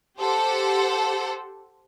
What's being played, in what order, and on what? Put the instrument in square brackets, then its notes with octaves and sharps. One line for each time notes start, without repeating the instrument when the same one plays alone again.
[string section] G4 A4 C5 F#5